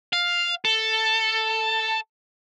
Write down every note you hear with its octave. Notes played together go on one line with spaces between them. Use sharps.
F5
A4